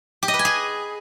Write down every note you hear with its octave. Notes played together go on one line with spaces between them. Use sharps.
G4
D#5
B4
G#5
G#4